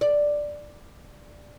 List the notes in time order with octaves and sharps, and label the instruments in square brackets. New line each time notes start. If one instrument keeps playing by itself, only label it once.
[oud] D5